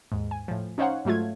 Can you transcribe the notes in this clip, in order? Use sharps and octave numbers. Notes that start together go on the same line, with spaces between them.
D#2 G#2
G#5
A2 F3
C#4 D#4 C5 C#5 F5 F#5
G#2 F#3 A3 F4 G#6